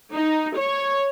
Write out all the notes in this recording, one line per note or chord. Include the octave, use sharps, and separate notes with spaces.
D#4
C#5